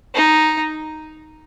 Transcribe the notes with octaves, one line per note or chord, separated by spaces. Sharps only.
D#4